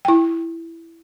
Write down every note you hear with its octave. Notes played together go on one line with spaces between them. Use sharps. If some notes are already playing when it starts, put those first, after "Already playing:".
E4 G5